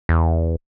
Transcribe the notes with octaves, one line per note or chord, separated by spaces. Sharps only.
E2